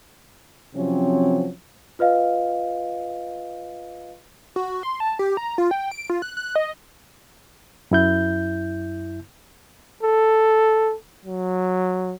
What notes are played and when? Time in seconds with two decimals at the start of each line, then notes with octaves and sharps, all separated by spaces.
0.75 C3 F3 F#3 C4 C#4
1.99 F4 B4 D#5 F5
4.56 F#4
4.83 C6
5.00 A5
5.19 G4
5.37 A#5
5.58 F4
5.71 G5
5.91 D7
6.10 F4
6.22 F#6
6.37 F#6
6.56 D#5
7.91 F#2 E4 G6
10.03 A4
11.25 F#3